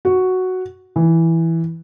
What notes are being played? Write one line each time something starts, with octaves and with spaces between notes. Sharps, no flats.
F#4
E3